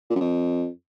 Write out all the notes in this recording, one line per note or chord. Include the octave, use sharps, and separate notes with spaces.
A#2
F#2
F2